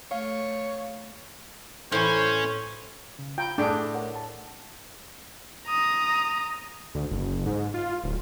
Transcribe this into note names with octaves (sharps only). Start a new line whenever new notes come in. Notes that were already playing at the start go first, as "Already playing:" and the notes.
A3 C#5 F5
A2 E3 C#4 C5 C#5
C#3
F4 G5 A#5 B5
A2 D4 G#4 G5 D6
A#4 C#5 F#5
A5
A#5 D#6
D2
F#1
G#2
F4
D1